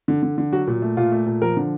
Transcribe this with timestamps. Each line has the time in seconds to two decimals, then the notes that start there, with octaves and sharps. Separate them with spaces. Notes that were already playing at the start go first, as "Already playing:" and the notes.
0.08 D3
0.23 D3
0.38 D3
0.53 F#3 F#4
0.67 A#2
0.82 A3
0.97 A#2 F4
1.12 A3
1.26 A#2
1.42 F3 A#4
1.57 D3